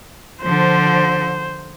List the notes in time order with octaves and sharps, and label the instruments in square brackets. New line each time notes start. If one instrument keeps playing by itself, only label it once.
[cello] D3 F3 [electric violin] C5